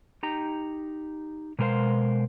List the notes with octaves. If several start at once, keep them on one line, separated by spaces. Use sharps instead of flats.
D#4 G4 A#5
B2 G#3 A#4 C5 F5